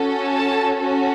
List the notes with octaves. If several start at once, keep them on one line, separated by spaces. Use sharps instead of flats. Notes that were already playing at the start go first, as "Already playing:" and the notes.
Already playing: C#4 F#4 A4
A5
C#4 F#4 A4